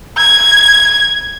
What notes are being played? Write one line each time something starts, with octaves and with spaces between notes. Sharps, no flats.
G#6